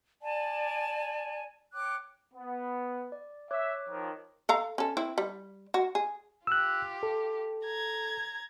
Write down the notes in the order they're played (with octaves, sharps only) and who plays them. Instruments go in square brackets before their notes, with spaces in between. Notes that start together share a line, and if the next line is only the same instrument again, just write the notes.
[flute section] D5 G#5 A5
C#5 G5 D6 F#6
[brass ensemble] B3
[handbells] D5
[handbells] C#5 D6 F#6 [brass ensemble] E5
[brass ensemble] D#3 F3
[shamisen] A4 F5 A#5
C#4 A4
C4 E4
G3
F#4
G#4
[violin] F4 G4 [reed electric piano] E6 F#6
[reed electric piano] A4
[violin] A#5 G#6